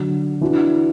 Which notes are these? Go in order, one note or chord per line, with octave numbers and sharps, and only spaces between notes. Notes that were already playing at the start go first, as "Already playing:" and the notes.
Already playing: D3 F#3 D4 F#4
E3 D4 F#4